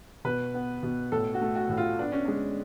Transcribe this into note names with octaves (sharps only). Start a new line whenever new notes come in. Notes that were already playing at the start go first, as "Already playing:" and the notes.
B2 B4
B3
B2
A2 A4
F#4
A3
F#4
A2
F4
B3 D4
C#4
G#3 D4